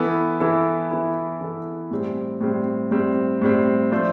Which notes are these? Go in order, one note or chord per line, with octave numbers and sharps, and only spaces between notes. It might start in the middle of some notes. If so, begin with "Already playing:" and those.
Already playing: E3 B3 E4 A4
E3 B3 E4 A4
E3 B3 E4 A4
E3 B3 E4 A4
A2 G3 C4
A2 G3 C4
A2 G3 C4
A2 G3 C4
F3 A3 D4 A4 C5